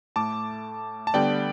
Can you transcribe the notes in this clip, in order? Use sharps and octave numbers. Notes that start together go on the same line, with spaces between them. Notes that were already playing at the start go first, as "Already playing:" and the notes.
A2 A3 A5 D6
A5
D3 G3 B3 D5 G5